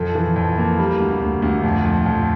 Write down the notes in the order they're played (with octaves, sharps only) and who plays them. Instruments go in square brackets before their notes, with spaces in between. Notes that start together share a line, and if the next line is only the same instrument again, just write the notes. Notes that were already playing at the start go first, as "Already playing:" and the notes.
Already playing: [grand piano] F2 A4
E3
F2
A#3
G3
D2
D2
D2
F2
F2
F2